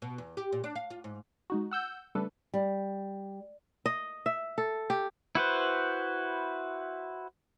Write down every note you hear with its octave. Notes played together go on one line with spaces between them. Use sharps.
B2
E2
G4
A#2
D4
F5
F4
G#2
G#3 D#4 F#4
F#5 E6 G6
C#3 G3 A3 D4 A4 B4
G3
D#5
E5
A4
G4
E4 F#4 B4 C5